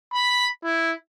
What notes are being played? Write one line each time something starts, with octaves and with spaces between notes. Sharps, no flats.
B5
E4